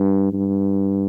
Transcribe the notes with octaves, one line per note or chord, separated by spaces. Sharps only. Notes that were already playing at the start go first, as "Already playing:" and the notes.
Already playing: G2
G2